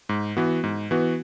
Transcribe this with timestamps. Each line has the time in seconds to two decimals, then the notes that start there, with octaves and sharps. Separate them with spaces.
0.09 G#2
0.37 E3 B3 F#4
0.64 G#2
0.91 E3 B3 F#4